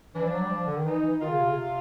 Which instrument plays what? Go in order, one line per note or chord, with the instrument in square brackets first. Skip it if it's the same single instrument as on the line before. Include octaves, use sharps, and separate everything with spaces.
[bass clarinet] E3 [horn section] D4
[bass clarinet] F3
F#3
G3
F3
D3
D#3
[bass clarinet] E3 [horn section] D#4
[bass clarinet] E3
[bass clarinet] D#3 [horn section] F4
[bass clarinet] C#3
C3
C#3
C3